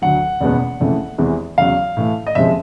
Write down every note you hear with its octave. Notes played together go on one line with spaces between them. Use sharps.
D2 D3 F#3 F#5
F#1 E2 B2 G#3 B3
F#1 F2 C#3 E3 A3
E2 C3 E3 G#3
E2 C#3 F#3 F5
A2 E3 A3
D#5
F#1 F2 C3 F3 G#3 E5